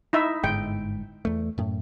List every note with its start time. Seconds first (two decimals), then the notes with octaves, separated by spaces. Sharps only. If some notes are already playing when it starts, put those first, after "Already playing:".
0.13 D#4 E4 E5
0.44 G1 G#2 G#3 G5
1.25 E2 A3
1.58 F#2 A2